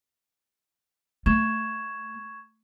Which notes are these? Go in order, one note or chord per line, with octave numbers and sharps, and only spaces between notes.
A3 C#6 G#6 E7